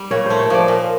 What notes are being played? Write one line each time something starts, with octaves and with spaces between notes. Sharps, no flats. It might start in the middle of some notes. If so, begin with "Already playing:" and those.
Already playing: G3
A#2 C#5
A3 C5
C#5
F3 D5
A#2